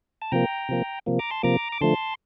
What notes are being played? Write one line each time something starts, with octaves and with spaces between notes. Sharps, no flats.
A5
C3 F3 A#3 G5 A#5
C3 F3 A#3
C3 F3 A#3
A#5 D6
A5 C6
C3 F3 A#3 A#5 D6
D6
D3 F3 A3 A5 C6